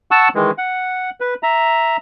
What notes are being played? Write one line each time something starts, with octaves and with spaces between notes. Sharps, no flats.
F#5 A5 C#6 E6
D#3 E3 G#3
F#5
B4
E5 A#5